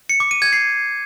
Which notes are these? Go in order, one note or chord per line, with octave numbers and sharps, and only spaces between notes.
C#7
D6
D#7
G#6
C7